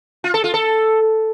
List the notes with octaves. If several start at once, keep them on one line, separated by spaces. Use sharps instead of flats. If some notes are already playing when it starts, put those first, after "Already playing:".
F4
A4
F4
A4